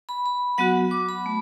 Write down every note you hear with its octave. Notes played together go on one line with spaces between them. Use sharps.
B5
B5
F#3 B3 F#4 F#5
D6
B5
A3